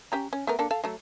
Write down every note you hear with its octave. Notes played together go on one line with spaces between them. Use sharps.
C#4 G4 A#5
C#4
A3 B3 A#4
A#3 D4 A4
A4 F5
F#3 A3